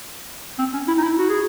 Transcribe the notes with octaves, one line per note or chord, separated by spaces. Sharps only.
C4
C#4
E4
D#4
E4
F#4
G#4